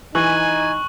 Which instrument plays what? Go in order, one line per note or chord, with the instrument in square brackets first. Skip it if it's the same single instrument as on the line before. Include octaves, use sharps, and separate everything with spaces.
[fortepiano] E3 [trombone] D#4 [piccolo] G#5 [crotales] C#6 F#6 F#7